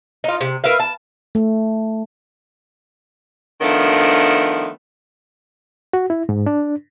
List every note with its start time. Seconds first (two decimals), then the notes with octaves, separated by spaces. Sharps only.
0.24 D#4 F4
0.41 C3
0.64 A#4 B4 E5 F5
0.79 A5
1.35 A3
3.61 D#3 F3 A3 B3 D4
5.93 F#4
6.10 E4
6.29 G#2
6.46 D4